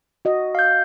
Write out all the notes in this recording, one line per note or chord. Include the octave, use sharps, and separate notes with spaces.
F#4 D#5
F5 G6